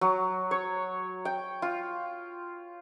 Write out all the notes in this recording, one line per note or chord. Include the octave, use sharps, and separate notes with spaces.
F#3
C#5
G5
F4